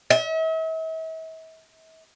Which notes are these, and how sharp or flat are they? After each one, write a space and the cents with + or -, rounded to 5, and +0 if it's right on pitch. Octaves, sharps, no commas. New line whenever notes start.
E5 -45